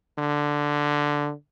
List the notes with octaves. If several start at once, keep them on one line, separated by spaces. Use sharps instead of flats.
D3